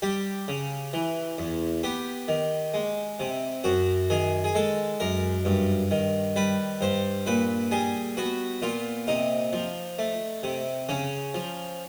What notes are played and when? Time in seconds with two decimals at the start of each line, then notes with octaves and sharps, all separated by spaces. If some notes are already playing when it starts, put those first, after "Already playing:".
0.02 G3 G4
0.48 C#3
0.93 E3
1.38 E2
1.83 B3 G4
2.28 D#3
2.74 G#3
3.20 C3
3.64 F#2 F#4
4.10 D#3 G#4
4.44 G#4
4.55 G#3 A4
5.00 F#2 A#4
5.45 G2
5.91 D#3
6.36 G3 B4
6.81 G2 C5
7.26 A#2 B4
7.71 G3 G#4
8.17 B3 F#4
8.62 A#2 F4
9.07 C3 D#4
9.53 F3
9.99 A3
10.43 C3
10.89 C#3 C#4
11.34 F3